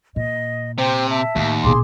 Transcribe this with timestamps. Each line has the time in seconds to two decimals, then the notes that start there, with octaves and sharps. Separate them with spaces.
0.16 A#2 D#5
0.78 C3 C5 G5
1.09 E5 A5
1.36 D#2 A2 D#3
1.64 A#1 B2 G#4 C6 D6